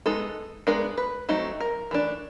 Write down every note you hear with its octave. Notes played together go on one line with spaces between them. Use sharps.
G#3 B3 D#4 A4
G#3 B3 D4 A#4
B4
F#3 A3 C4 D#4
A#4
E3 A3 D4